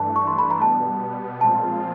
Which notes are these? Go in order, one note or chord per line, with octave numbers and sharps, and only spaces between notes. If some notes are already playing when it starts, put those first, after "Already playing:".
Already playing: G2 E3 A3 D4 A5
C#6
C6
B5
A#5
B2 G3 B3 A5
A#2 F3 G#3 C4 F4 A5